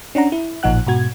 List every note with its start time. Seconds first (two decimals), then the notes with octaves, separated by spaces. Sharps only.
0.15 C#4 D4 F#5 A#5
0.32 E4
0.63 A1 A#2 F3 D#4 F#5 F#6
0.86 G#2 B2 F#4 G#6